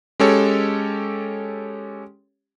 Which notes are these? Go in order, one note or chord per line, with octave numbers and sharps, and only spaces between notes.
G#3 C#4 G4 A4 C#5